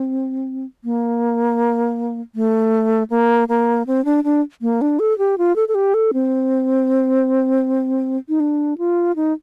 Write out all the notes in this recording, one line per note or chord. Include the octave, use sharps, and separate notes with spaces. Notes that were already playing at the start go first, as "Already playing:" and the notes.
Already playing: C4
A#3
A3
A#3
A#3
C4
D4
D4
A#3
D4
A4
G4
F4
A4
A4
G4
A4
C4
D#4
D4
F4
D#4